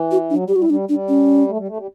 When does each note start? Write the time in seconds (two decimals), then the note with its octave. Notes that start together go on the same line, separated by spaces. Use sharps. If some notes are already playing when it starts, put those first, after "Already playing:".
Already playing: E3
0.11 F#4
0.30 F#3 D4
0.43 G3
0.48 G4
0.56 G3 F#4
0.62 E4
0.69 G3 D4
0.89 G3 D4
1.08 C#4
1.47 A3
1.57 G3
1.68 A3
1.77 G3